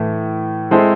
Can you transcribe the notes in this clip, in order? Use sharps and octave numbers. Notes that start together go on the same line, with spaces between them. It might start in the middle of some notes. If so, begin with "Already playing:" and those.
Already playing: A2 E3 A3
G#3 C4 E4 A4 C5